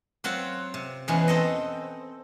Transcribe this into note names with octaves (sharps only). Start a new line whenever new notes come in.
F#3 C4 F4 F#5
C3
E2 B2 E3 G#3 C#4
C4 A4 D#5